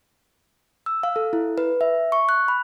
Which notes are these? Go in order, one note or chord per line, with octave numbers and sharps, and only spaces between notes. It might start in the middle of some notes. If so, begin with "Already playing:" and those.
E6
F5
A4
E4
B4
E5
C#6
F#6
B5